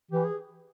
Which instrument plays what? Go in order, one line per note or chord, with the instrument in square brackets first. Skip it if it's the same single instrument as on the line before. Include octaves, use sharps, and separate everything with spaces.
[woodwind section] E3 [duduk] G4
[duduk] G#4